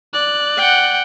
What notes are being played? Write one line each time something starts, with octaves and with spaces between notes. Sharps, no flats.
D5 F#6
F#5 G5